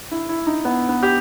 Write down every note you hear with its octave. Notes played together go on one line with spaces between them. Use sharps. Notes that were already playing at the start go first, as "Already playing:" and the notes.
E4
E4
D#4
B3
B3
G4